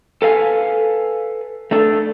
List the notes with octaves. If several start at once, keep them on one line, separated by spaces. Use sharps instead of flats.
A4 B4 F5 G#5
A3 D4 A4